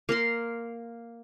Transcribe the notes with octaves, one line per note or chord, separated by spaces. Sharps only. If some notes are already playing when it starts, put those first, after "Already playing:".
A#3 A#4 C6